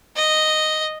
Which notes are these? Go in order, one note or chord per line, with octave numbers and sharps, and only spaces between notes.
D#5